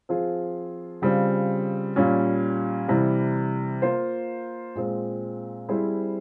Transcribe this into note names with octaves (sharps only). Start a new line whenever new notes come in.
F3 C4 F4 G#4
C#3 G3 C4 F4
A#2 G3 C#4
C3 E3 G3
A#3 F4 C5
A#2 G#3 C4
G3 C4 E4 G#4 C5